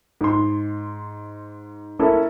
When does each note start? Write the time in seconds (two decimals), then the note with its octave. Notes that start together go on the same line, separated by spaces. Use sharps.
0.21 G#2 C6
1.99 A#3 C#4 E4 A4